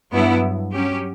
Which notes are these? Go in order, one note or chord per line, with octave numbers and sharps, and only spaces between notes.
G2 F#3 B3 E4
F#3 C#4 G4